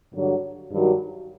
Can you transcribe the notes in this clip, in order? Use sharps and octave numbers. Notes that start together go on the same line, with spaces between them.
G2 D3 F#3
G2 D#3 F#3